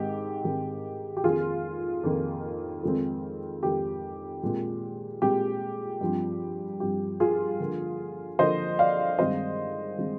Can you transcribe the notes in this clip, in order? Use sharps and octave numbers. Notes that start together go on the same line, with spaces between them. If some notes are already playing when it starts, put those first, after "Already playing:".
Already playing: G#2 D#3 G#3 C4 G4
G#2 D#3 G#3 C4
G4
F2 D#3 A#3 F4 G#4
F2 D#3 A#3
F2 D#3 G#3 C4
F2 D#3 G#3 C4 G4
A#2 G#3 C4
A#2 G#3 C4 G4
G2 F3 C4
G2 F3 C4 G4
F4 G#4
D3 F3 A#3
D3 F3 A#3 C5 D#5
D5 F5
G2 D#3 G#3 C4 C5 D#5
D#3 G#3 C4